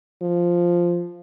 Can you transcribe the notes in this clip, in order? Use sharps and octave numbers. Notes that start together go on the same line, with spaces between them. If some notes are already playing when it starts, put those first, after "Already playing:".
F3